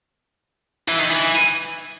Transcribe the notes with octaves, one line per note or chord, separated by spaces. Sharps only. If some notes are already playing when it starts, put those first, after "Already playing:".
E3
D#3
E3